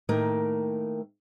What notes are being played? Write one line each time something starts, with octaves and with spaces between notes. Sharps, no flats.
A2 D#3 A3 A#3 A#4 G5